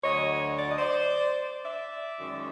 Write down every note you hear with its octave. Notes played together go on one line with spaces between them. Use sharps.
D2 D3 F#3 C#5 D#5
D5
D#5
C5 D5
D5 E5
F#2 D#3 G#3